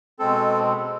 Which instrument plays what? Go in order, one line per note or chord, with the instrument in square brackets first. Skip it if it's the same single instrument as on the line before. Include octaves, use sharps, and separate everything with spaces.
[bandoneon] B2 G#3 C4 A4